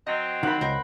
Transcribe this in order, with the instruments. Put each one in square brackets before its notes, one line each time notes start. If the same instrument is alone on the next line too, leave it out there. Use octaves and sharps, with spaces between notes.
[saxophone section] F#3 C4 [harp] D#5
[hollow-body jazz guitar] D#3 [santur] F#5 B5
[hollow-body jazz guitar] C#2 [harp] A#4 C5 G5